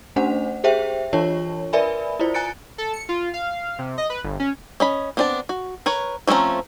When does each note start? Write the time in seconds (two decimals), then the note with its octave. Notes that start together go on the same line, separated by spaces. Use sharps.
0.16 A3 C#4 D4 C5 F#5
0.64 G4 G#4 C5 E5 G5
1.13 E3 D4 F4 C#5 A5 C#6
1.73 A#4 B4 D5 E5 G#5 B5
2.19 E4 F4 C5 D5
2.34 G#5 A#5 F#6 A6 C#7 D7
2.78 A4
2.93 C#7
3.09 F4
3.34 F5
3.79 C3
3.98 D#5
4.10 B4
4.23 G1
4.40 C#4
4.80 C#4 D#5 B5
5.17 B3 C4 D4 D#5 A5
5.49 F#4
5.86 A#4 B4 C#5
6.27 F3 A3 C4 C#4 A#5